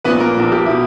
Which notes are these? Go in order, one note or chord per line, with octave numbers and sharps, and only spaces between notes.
A#1 A#2 B3 B4
A#3 A#4
A#1 A#2
G4
B2 E4